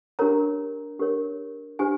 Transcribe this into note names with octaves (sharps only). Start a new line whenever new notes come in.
D4 G4 A#4 C#5 A#5
D4 G4 A#4 C#5
D4 G4 C5 G#5